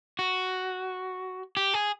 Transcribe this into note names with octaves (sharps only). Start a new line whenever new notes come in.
F#4
G4
G#4